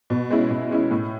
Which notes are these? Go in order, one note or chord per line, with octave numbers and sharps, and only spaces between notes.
B2
G#3 C#4 E4
B2
G#3 C#4 E4
A2